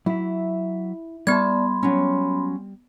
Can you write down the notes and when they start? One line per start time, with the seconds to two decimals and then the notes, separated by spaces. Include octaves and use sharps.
0.06 F#3 E4 E5
1.27 G3 B3 D5 A5 B5 C6 G#6
1.83 F#3 C#4